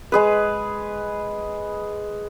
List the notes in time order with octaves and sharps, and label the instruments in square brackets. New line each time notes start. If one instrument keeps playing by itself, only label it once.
[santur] G#3 G#4 B4